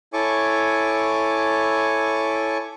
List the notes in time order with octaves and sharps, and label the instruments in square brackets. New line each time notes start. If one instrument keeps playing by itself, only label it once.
[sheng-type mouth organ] E4 A4 C#5 G#5 C#6 D6